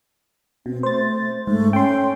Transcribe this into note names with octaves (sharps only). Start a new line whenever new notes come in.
B2 C4
A3 C5 A6
G#2 A3
C#4 G5 C6